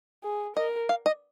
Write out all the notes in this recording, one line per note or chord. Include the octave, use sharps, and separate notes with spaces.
G#4
A#4 D#5
F5
D#5